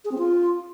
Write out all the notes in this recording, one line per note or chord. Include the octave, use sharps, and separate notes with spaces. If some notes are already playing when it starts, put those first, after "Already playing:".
G#4
C4
F4